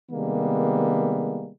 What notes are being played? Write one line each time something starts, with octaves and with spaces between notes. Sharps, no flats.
C3 D#3 G3 G#3 A#3 B3